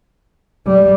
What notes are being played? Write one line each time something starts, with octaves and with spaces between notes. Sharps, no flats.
G3